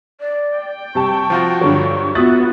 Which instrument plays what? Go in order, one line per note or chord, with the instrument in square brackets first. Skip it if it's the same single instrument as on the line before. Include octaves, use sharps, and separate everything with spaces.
[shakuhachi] D5
[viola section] G5
[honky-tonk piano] C3 G3 A5 [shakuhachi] C#6
[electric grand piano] F3 F4 F#4
[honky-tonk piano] G2 D3 F#3
[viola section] B3 F4 F#4 [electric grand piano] E5 [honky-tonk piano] D#6 F#6 A6